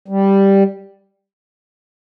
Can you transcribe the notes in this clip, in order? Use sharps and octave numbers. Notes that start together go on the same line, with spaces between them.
G3